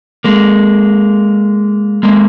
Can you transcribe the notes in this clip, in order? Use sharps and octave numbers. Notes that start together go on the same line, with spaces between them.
G#3 A#3
G#3 A#3